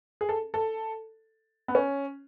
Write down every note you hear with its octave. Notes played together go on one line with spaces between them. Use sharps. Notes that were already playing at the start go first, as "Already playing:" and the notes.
G#4
A4
A4
B3
C#4